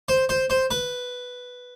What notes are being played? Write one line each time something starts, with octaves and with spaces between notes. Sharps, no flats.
C5
C5
C5
B4